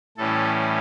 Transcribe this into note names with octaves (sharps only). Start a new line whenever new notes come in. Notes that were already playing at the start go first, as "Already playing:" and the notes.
A2 E3 G3 C#4 A4